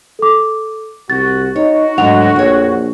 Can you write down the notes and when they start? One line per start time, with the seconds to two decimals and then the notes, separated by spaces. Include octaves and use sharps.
0.19 A4 D6
1.10 C2 F#4 A6
1.56 D#4 F#4 C#5
1.98 D2 G#2 F#3 D4 F#5 F7
2.36 A#1 F2 C#5